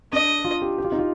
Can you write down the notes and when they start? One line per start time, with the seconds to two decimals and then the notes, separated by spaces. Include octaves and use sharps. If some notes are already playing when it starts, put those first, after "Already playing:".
0.13 D4 D#5
0.45 F4
0.62 G4
0.78 G4
0.85 F4
0.92 D#4
0.99 F4